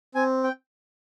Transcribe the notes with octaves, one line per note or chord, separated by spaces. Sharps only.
C4 G#5
G5